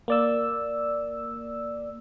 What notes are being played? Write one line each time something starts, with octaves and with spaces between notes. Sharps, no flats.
A#3 D5 E6